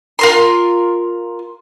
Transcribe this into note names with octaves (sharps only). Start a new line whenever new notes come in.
F4 A#4 C6